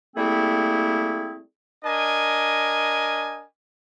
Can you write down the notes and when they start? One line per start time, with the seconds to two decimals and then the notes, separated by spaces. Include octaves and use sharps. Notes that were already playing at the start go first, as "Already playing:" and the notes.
0.16 G3 A3 A#3 C4 E4 G#4
1.85 D4 A#4 D#5 G#5